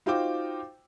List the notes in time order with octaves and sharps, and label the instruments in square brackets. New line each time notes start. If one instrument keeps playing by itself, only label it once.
[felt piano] D#4 F4 F#4 C5 G5 D6